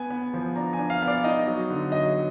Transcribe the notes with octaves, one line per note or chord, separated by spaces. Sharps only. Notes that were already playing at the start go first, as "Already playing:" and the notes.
Already playing: B3 G#5
B3
F3
D4 A#5
G#5
D4
F5
B3
D5
D#4 D#5
F#3
D3
F#3 D#5